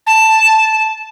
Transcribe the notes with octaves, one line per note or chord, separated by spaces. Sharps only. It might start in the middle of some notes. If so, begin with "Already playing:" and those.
A5